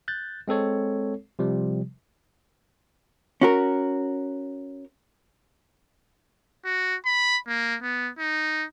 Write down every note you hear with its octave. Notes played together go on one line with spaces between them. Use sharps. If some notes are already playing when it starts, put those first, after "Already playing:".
F#6 G6 A6
G#3 C4 A4 C#5
C3 F3 G3
C#4 F#4 A#4
F#4
B5
A#3
B3
D#4